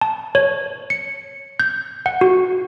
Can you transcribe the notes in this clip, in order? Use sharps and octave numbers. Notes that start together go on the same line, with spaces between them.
A5
C#5
C#7
G6
F#5
F#4